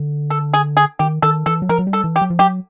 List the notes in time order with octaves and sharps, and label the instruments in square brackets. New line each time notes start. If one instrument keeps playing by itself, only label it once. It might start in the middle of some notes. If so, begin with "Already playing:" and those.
Already playing: [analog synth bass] D3
[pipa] A4
G#4
G#4
[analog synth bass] D#3 [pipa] G4
[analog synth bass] D#3 [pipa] A4
[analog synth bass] E3 [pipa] A4
[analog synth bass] F#3
[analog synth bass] F3 [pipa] A#4
[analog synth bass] F#3
G3
[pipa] A4
[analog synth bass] E3
[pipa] G4
[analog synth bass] F#3
F3
[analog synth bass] F#3 [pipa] G4